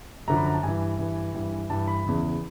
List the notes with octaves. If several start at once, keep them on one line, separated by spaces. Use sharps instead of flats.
F#2 D3 F3 A#5
B5
A#5
A5
G2 E3 G#5
G2 E3
G2 E3
G2 E3 A5
B5
E2 C#3 E3